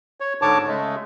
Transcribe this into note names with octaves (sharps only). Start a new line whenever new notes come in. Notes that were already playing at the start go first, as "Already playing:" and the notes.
C#5
G#2 D3 C#5 A5 D6
C#3 G#3 A3